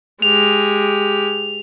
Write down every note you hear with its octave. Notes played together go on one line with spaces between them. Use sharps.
G#3 G4 F7